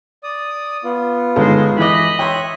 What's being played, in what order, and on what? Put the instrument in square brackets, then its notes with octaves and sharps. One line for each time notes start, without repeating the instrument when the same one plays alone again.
[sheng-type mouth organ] D5 D#6
B3 F4
[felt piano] G1 D#4 A4 [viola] G#3 C5
[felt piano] E3 D6 [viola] D#5 B5
[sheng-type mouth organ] C#5 E5 F#6 [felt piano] G5 C6